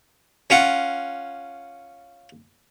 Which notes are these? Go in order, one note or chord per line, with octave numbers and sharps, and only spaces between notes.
C#4 F4 F#5